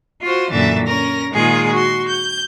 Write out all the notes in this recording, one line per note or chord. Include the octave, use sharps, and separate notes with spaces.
F4 F#4 C5
F#2 A#2 D3 E3 E5 A6
C#4 A#4 A#6
A#2 D#3 G#3 F4 G#4
F#4 C6
G6